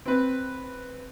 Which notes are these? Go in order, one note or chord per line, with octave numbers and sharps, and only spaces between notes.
C4 B4